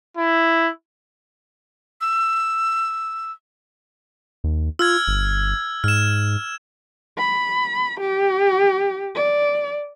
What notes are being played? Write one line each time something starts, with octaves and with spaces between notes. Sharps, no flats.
E4
E6
D#2
F4 E6 F6 G#6
G1
G#2 F6 E7
B5
G4
D5